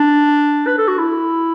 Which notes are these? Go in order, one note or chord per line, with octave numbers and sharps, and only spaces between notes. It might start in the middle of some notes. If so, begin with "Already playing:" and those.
Already playing: D4
B4
A4
F#4
E4